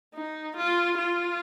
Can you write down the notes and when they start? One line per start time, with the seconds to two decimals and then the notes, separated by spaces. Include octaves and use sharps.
0.15 D#4
0.57 F4
0.98 F4